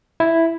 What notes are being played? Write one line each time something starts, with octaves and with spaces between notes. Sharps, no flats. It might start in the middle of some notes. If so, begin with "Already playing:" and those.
E4